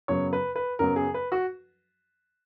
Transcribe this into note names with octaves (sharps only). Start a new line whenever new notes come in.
F#2 C#3 F#3 B3 C#5
B4
B4
F#2 C#3 F#3 B3 A#4
G#4
B4
F#4